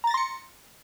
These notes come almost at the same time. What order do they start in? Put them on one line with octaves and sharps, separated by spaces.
A#5 A6 A#6 C6 C#7